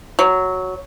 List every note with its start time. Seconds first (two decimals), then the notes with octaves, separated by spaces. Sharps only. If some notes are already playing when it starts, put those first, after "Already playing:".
0.19 F#3